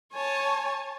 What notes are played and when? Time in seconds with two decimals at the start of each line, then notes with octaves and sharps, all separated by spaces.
0.12 C#5 G#5 A5